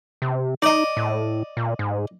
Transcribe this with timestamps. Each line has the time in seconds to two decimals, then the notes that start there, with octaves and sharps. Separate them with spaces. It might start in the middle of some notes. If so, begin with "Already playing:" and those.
0.22 C3
0.62 D#4 D5 D#5
0.97 A2
1.57 A#2
1.79 G#2